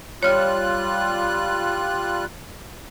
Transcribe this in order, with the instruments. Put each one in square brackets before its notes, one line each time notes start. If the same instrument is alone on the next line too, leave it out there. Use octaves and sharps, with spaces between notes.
[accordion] G3 F4 F#6 [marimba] C#5 F6